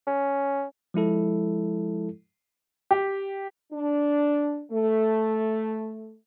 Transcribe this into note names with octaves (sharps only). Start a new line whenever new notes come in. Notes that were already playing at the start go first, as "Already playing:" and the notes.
C#4
F3 G#3 E4 A4
G4
D4
A3